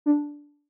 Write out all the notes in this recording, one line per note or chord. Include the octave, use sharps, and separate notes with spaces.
D4